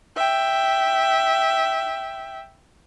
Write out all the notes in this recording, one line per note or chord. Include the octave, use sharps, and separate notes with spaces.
E5 G5